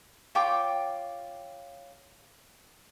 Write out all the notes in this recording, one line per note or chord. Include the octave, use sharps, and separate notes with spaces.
F4 C#5 G5 D6